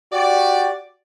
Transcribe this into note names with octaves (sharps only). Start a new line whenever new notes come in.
F#4 G4 D5